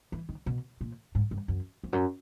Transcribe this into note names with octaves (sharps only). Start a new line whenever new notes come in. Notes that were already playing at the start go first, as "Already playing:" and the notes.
E3
D#3
B2
A#2
G#2
G2
F#2
F2
F#2